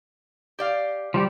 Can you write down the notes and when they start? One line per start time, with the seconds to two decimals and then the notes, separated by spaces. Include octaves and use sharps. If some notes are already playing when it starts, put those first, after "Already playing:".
0.59 G4 D5 F5
1.14 F3 G3 G4